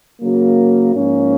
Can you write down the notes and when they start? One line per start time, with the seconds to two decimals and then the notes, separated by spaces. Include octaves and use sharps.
0.22 C#3 F#3 A#3
0.95 G#2 F3 A#3 C#4